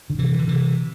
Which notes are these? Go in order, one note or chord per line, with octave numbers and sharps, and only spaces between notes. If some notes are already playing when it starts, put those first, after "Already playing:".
D3
C3 E3
D3
C3 E3